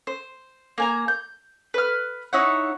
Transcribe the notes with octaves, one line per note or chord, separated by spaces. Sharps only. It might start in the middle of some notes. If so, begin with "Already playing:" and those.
C5
A#3 G#5 A#5
G6
B4 F6
D#4 E4 C#5 F#5